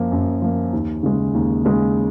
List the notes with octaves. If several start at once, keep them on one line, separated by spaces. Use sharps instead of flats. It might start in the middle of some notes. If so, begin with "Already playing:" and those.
Already playing: F#2 F3 A#3
F#2
F3 A#3
D#2
C#3 G#3
D#2
C#3 G#3